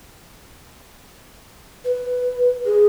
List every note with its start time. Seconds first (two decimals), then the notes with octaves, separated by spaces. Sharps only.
1.85 B4
2.66 G#4